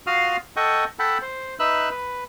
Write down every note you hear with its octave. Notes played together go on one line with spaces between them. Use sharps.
F4 F#4 F5 C6 D#6 F6
A4 D#5 F#5 G5 C#6 D#6
A4 F#5 G5 A5 B5
C5
D#4 B4 E5 E6 F#6
B4